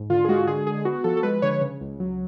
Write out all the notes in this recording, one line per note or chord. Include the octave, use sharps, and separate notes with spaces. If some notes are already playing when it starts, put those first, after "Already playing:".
Already playing: G#2
D3 F4
G#4
G#3 F#4
D3 G#4
D3 G#4
B3 F#4
F3 A4
A4
G#3 B4
D3 C#5
C#3
C#2
F#3